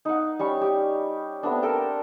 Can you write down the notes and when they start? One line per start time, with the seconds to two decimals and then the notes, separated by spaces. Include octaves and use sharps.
0.05 D#4 F#5
0.39 G3 C#4 C#6
0.61 G4
1.43 A3 B3 C4 D4
1.62 A4 A#4 G5 A5